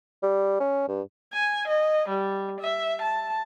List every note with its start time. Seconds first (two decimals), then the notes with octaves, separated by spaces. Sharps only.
0.23 G3
0.60 C#4
0.89 G2
1.33 G#5
1.68 D#5
2.09 G3
2.61 E5
3.01 A5